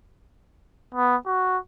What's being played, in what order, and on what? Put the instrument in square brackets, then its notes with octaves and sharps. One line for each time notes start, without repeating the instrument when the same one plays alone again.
[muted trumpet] B3
F#4